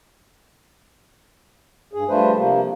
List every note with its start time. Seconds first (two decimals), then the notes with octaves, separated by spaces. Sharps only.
1.93 G2 G#4
2.09 F3 G3 A3 D4 B4 C5
2.37 C3 F3 A#3